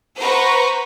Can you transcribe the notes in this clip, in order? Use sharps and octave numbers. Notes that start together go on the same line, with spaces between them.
B4 C5 F#5 A#5 C#6